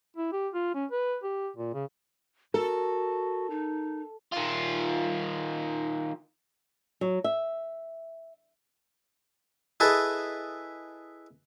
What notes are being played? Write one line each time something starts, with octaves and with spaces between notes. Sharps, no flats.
E4
G4
F4
C#4
B4
G4
A#2
C#3
F#4 A4 A#4
D#4
D#3 F4
F#3
E5
E4 G#4 A4 B4 D#5